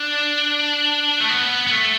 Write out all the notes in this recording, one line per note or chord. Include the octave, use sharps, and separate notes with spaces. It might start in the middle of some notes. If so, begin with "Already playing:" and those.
Already playing: D4
A3
B3
B3
A3